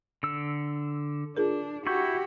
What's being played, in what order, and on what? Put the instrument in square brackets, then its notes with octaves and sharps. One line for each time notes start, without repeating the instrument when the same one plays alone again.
[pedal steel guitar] D3 E6
[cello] D4 [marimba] F4 G#4 A#4
[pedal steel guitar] E4 C#6 G6 [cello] F#4 G4